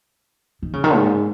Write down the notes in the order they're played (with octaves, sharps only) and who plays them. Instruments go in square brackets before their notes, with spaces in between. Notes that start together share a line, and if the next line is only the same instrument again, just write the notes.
[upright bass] D#3
C#3
D#3
G#2